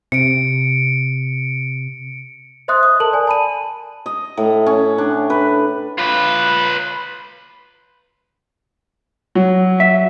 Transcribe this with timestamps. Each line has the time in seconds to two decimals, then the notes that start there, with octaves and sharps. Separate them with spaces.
0.12 C3 C#7 D7
2.68 C5 D#5 E5 C6 D#6 F#6
2.83 D#6
3.00 A4 A#4 A5 F#7
3.13 D5 G#5
3.27 A5 B5 D#7
4.06 D#5
4.37 A2
4.67 C#4
4.98 D4
5.30 B4
5.98 F4 B4
9.35 F#3
9.80 E5